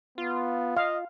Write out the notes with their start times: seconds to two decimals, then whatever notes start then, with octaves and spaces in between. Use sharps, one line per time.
0.18 B3 F4
0.77 D#5 F5